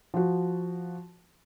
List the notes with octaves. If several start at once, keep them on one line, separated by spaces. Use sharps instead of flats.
F3 F#4